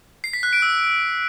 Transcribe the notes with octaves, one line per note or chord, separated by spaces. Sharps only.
C7
B6
F#6
D7
E6